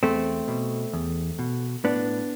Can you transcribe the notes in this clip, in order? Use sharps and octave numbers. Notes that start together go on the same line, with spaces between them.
E2 A3 C4
B2
E2
B2
A2 B3 D4